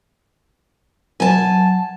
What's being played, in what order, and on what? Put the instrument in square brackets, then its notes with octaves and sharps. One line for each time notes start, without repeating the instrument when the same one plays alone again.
[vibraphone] F#3 [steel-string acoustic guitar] G#5 A5